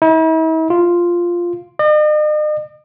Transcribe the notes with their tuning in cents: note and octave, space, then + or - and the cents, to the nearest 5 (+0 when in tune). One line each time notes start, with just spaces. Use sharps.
E4 -45
F4 +0
D#5 -45